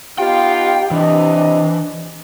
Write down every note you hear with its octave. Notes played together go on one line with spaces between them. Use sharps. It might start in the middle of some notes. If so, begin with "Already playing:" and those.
B3 D#4 F4 G4 G5
C3 E3 D4 D#5